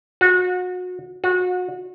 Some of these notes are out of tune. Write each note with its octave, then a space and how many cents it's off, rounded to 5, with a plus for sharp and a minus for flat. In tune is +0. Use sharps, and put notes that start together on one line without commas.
F#4 -30
F#4 -30